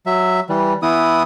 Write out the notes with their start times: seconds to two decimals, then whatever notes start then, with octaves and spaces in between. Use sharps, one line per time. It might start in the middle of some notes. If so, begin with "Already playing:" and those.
0.06 F#3 E5
0.49 E3 G3
0.82 E3 B3 E4 D#6